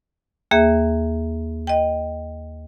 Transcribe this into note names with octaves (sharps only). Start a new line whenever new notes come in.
D#2 A#3 G#4 E5
D#5 G5